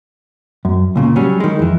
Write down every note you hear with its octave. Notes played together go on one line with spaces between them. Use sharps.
F#2
C#2 A#2 C#3
F#3 G3 C#4
D#3 G#3
F2 E3